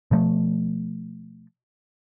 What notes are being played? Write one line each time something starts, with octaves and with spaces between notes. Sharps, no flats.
B2 F3 A3